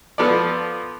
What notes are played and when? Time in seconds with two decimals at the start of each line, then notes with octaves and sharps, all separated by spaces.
0.18 F3 B3 A4 D5